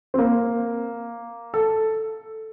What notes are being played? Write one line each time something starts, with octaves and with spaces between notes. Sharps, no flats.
C4
A#3
A4